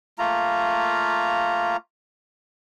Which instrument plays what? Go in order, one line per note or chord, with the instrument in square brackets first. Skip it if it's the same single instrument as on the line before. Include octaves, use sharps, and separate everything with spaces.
[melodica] A3 A#3 F4 A#5